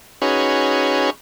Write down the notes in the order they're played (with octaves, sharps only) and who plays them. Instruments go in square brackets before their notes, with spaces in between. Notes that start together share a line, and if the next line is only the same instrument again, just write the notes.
[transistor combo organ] C#4 D#4 F#4 G#4 B4 C#5